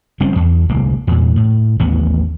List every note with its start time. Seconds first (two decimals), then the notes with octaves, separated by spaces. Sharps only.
0.20 F#1 G3 C4 C#4
0.36 E2
0.69 D1 C2 A#3
1.07 E2 A#2
1.36 A2
1.79 A1 D#2 B3